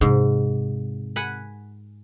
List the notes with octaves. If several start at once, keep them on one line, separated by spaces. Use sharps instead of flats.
G#2 C3
F#5 G#5 B5